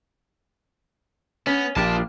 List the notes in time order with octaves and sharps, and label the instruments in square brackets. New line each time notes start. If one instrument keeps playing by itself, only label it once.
[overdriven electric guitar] B3 [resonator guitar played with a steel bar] C#4
[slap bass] A#1 [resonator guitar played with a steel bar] A#3 D4 G4 [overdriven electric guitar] F4 A5